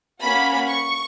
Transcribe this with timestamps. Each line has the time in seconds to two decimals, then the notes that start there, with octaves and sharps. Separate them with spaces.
0.22 A#3 C#4 F#4 B5
0.69 C#6